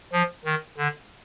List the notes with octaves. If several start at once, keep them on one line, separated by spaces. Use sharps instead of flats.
F3
D#3
D3